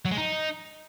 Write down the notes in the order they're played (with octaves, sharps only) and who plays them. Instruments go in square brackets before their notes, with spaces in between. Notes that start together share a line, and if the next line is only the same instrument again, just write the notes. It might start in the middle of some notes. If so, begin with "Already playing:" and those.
[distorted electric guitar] F#3
G#3
D#4